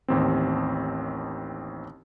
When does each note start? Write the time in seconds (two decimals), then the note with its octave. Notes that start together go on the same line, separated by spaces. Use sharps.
0.08 A1 D#2 C4